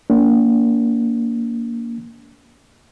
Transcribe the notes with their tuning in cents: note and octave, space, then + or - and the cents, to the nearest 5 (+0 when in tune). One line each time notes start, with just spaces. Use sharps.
A#3 +0 D4 -40